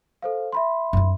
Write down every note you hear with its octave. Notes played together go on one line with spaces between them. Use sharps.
A4 C5 F5
E5 B5 C6
F#2 D#4